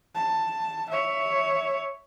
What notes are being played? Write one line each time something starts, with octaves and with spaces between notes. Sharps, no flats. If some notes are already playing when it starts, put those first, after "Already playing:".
A5
C#5 E5